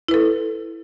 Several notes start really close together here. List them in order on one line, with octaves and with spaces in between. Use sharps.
E4 B4 A4